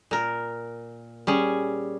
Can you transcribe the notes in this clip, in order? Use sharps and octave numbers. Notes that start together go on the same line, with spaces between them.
A#2 A#4
G3 C#4 G#4